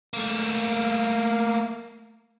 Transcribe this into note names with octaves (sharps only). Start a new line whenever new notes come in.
A3 A#3